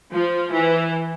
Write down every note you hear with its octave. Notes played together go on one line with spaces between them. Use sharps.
F3
E3